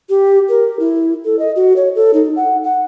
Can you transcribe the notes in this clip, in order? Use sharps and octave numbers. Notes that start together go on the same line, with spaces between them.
G4
A#4
E4
A4
D#5
F#4
C#5
A4
D#4
F#5
F#5